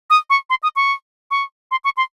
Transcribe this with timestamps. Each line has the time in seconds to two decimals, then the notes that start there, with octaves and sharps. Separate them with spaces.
0.10 D#6
0.30 C#6
0.50 C6
0.63 D#6
0.76 C#6
1.31 C#6
1.71 C6
1.84 C#6
1.97 C6